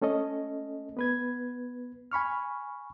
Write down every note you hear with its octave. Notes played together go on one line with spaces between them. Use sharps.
A3 C#4 A4 D#5
B3 B4 G#6
G#5 B5 C#6 F6